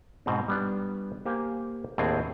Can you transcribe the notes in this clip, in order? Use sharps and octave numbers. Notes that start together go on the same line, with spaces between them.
G#2 B2 C4
G3 B3 D4
A#3 G4 C5 F5 G#5
D#2 A2 C4 D4 G#4 G#5